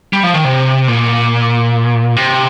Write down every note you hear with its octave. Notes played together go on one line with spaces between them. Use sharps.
G3
F3
D#3
C3
A#2
C3